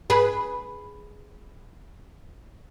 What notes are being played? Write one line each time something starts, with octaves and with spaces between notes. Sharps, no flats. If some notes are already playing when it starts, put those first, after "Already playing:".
G#4 B4